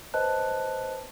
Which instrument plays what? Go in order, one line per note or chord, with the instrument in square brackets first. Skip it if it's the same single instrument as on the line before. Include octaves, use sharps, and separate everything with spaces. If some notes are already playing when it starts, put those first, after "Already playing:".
[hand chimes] B4 C5 D#5 A5 F#6